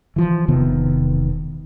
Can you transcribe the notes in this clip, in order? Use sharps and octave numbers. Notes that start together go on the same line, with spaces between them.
E3 F3
E1 C3 D#3 B3